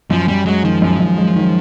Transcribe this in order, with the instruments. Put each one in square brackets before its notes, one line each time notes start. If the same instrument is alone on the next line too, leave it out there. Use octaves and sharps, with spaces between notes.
[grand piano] F#2 [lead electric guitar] F3
[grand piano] F#2 [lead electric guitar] G3
[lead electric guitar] F#3 [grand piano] G#3
[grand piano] D#3 [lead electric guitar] F3
[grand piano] F#2
F#2
G#3
D#3